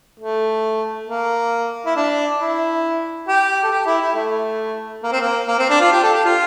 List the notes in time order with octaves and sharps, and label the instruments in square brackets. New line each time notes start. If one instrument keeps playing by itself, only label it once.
[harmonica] A3
A#3
E4
D4
E4
G4
A4
G4
E4
E4
A3
A#3
C4
A#3
A#3
C4
D4
F4
G4
A4
G4
F4